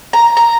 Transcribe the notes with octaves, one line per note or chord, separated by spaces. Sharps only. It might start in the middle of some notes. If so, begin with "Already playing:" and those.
A#5
A#5